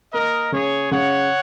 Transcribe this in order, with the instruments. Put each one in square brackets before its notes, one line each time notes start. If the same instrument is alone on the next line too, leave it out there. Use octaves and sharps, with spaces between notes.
[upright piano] A#3 [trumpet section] A#4 D#5
[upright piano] C#3 [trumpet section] G#4 C#5
[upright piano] C#3 [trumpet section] C#5 F#5